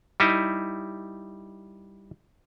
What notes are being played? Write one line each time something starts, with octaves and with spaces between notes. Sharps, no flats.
G3 D#4 E4